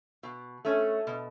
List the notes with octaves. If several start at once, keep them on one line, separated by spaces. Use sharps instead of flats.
B2
A3 C#4
B2